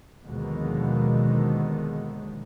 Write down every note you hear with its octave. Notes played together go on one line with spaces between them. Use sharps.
D#2 B2 D3 D#3 F3 G#3